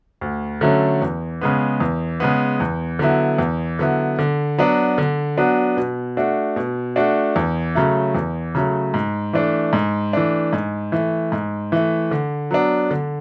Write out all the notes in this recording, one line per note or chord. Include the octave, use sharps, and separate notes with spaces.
D2
D3 F#3 A3 C#4
E2
C#3 G#3 B3
E2
C#3 G#3 B3
E2
D3 F#3 B3 E4
E2
D3 F#3 B3 E4
D3
F#3 B3 D4 F#4
D3
F#3 B3 D4 F#4
B2
A3 D4 F#4
B2
A3 D4 F#4
E2
C#3 F#3 A3
E2
C#3 F#3 A3
G#2
E3 A3 D4
G#2
E3 A3 D4
G#2
E3 A3
G#2
E3 A3
D3
F#3 B3 D4
D3